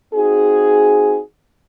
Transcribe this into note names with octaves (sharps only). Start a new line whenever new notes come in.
C4 D#4 F#4 G#4